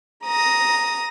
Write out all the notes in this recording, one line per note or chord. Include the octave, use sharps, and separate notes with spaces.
A#5 D#6 A#6